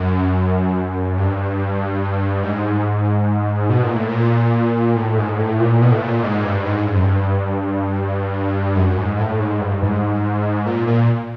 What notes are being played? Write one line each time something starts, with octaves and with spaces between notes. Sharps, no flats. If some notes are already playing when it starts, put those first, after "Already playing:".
Already playing: F#2
G2
G#2
B2
A#2
A2
A#2
A2
G#2
A2
A#2
B2
A2
A#2
G#2
G2
G#2
G2
F#2
G2
F#2
G#2
A2
G#2
G2
G#2
A#2
A#2